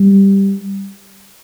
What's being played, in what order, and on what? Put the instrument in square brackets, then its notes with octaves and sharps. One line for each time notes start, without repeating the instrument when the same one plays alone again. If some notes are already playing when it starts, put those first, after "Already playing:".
Already playing: [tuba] G3